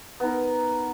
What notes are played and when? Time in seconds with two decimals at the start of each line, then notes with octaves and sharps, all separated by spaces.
0.20 B3
0.23 D#4
0.27 A#4